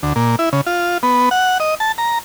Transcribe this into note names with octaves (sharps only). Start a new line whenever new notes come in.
D2
A#2
E4
C#3
F4
B3
F#5
D#5
A5
A#5